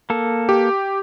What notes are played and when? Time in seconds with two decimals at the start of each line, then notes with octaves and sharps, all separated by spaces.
0.10 A#3 A4
0.49 G4